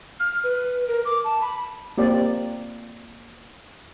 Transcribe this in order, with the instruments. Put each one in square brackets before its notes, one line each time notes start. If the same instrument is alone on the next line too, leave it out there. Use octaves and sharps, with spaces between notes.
[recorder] F6
B4
A#4
D6
A5
B5
[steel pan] A#3 C4 G4 D5